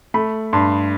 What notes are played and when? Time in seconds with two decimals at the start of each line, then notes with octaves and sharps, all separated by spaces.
0.14 A3 B5
0.53 G2 C6